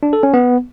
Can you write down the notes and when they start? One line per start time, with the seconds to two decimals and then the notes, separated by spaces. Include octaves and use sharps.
0.03 D4
0.13 A4
0.23 C#4
0.34 B3